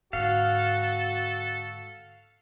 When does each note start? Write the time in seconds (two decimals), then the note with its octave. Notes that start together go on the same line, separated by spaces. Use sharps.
0.13 G#2 D3 F#4 A4 F5